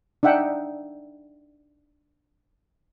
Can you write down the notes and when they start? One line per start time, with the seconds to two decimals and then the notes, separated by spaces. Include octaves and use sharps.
0.23 D4 D#4 E5 F#5 G5